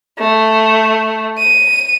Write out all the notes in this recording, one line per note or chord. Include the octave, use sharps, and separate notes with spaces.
A3
D#7